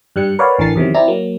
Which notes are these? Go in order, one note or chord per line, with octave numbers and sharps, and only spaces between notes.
G2 G3 F#6 C#7
A#4 B4 C#5 D5 F5 F#5
A1 D3 E3 A#4 A6 C7
E2 C3 D#3 F#3
C4 E4 D5 A#5
F#3 A#3